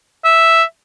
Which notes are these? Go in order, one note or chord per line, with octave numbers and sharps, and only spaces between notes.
E5